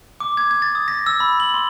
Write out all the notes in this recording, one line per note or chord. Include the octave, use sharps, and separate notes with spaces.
D6
G#6
G#6
A6
D#6
A#6
E6
B5
F#7
C6